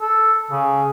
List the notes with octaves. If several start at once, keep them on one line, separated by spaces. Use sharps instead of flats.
A4
C#3